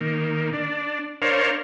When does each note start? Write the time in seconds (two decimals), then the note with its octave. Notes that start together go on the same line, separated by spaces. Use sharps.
0.01 D#3 A#3
0.53 D4
1.22 D4 A#4 C5 C#5 F5